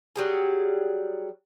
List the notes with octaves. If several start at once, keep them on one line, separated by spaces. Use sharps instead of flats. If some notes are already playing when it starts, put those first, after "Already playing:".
F#3 G3 G#4